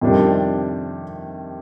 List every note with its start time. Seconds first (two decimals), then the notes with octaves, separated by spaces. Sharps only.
0.01 F2 C3 D#3 G3 D4